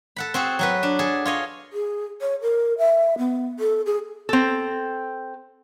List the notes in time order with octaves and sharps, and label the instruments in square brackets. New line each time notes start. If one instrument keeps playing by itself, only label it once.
[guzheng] A4 F#5 B5
C4 F#4 G#4 A4
F#3 F#4 B4
D4
G#4 A4
F4 C#5 D#5
[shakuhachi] G#4
C#5
A#4
E5
B3
A4
G#4
[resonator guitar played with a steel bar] C4 A4